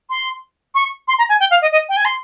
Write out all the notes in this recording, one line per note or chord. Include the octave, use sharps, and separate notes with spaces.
C6
C#6
C6
A#5
G#5
G5
F5
D#5
D#5
G5
G#5
C6